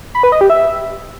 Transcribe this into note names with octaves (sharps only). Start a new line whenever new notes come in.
B5
B4
D#5
G4
E5